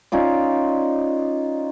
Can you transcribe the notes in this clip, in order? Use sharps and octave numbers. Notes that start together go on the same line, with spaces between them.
C#4 D#4 F4 D5